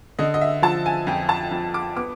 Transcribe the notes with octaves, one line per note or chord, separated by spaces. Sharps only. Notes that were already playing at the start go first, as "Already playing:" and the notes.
D3 D#5
D#5
E5
F3 A5
G#5
F2 G5
A5
F2
D6
B3 D6